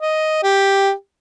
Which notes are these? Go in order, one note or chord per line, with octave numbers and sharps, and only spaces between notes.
D#5
G4